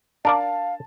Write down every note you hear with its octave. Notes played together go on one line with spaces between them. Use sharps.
D4 A#4 D5 F5 A5